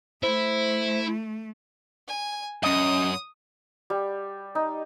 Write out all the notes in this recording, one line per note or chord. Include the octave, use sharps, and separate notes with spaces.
A3 E4 C5
G#5
F#2 C#4 D#5 D#6
G3
D#4